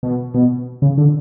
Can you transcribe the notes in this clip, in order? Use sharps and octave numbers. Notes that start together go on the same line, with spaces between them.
B2
B2
C#3
D3